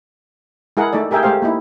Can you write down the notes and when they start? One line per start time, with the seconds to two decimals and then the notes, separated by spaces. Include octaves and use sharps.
0.77 G#3 E4 G#4 A#4 F#5
0.93 A3 D#4 A4 D5
1.11 G4 G#4 A#4 E5 G5 G#5
1.23 G#3 A3 G4 C5 F5
1.42 A#3 D#4 E4